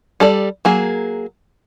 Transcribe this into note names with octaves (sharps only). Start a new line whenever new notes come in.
G3 A4 D5
F#3 A#3 G#4